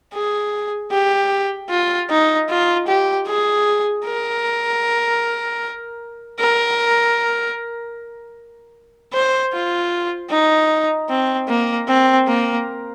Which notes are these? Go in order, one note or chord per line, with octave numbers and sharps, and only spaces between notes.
G#4
G4
F4
D#4
F4
G4
G#4
A#4
A#4
C5
F4
D#4
C4
A#3
C4
A#3